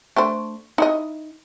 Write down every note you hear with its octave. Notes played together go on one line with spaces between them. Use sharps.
A3 D4 C5
D#4 E4 D#5